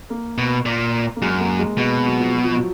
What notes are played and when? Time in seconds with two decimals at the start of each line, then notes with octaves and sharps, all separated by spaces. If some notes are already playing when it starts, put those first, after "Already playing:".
0.10 A#3
0.38 B2
0.66 A#2
1.16 A#3
1.22 F#2 G#3
1.40 A#3
1.59 G#3
1.77 B2 G#3
2.05 F#3
2.20 F3
2.32 F#3
2.44 F3
2.56 F#3